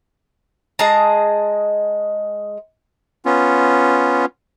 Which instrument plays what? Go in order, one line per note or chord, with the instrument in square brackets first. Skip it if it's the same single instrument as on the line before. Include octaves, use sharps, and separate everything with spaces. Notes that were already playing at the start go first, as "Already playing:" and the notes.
[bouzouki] G#3 G#4 A5 A#5
[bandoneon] B3 C#4 F4